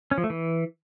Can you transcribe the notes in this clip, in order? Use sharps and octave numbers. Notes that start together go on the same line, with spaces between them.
C#4
F3
A3
E3